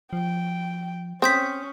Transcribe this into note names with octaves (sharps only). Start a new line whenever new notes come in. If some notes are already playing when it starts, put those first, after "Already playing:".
F3 G5
C4 C#4 D#6 G6 B6